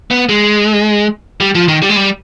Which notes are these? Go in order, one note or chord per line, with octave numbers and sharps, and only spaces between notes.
B3
G#3
G3
F3
D#3
G3
G#3
G3